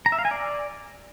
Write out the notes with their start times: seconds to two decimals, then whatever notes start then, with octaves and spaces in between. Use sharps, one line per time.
0.06 A#5
0.12 E5
0.19 F5
0.25 G#5
0.31 D5